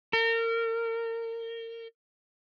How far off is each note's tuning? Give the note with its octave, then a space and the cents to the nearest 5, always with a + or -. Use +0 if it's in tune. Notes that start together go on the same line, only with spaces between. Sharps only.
A#4 -30